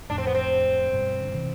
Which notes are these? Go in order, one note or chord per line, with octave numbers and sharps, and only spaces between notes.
F2 A2 D4
C4
B3
C4
G2 B2
D3
C3 E3